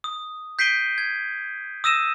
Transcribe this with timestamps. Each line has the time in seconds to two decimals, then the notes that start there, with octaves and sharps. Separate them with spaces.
0.04 D#6
0.59 G6 B6 C7 D7 D#7 G7
0.98 G#6
1.84 D#6 E6 A#6 D#7 E7